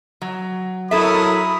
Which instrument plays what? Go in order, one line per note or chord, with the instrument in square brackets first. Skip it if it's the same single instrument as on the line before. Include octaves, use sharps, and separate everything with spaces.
[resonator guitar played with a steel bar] F#3
[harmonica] F#3 A#4 D#6 [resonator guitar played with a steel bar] E4 A4 E5 [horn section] B5